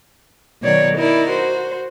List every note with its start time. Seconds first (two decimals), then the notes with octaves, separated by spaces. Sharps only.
0.62 B2 D#3 F#3 C#5 D5
0.97 D#4 E4 A#4 D5
1.29 F#4 C5